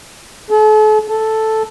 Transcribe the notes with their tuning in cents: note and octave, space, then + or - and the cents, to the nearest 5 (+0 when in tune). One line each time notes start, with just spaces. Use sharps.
A4 -40
A4 +0